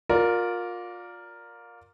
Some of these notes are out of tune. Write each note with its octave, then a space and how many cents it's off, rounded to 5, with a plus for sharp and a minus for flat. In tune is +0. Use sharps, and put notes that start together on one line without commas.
F4 +30 A#4 +0 D5 -15